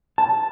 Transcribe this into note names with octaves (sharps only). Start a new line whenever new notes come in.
A5